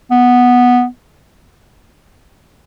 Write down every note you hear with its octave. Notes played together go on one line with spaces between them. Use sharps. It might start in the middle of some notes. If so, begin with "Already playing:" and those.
B3